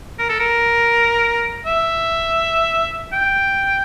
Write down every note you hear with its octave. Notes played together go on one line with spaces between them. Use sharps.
A#4
A4
A#4
E5
G5